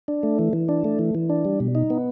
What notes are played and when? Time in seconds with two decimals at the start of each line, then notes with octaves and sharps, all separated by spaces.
0.08 D4
0.23 A3
0.39 E3
0.53 E3
0.69 D4
0.84 A3
0.99 E3
1.15 E3
1.29 D4
1.45 G3
1.60 B2
1.75 D#4
1.90 B3